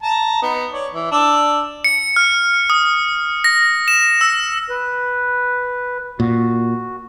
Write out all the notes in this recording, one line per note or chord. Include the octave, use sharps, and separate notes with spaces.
A5 A#5
B3 D#4
C#5 D5
E3
D4 D5 E6
C#7
F6
D#6
A#6
E7
E6
B4
A#2 F#4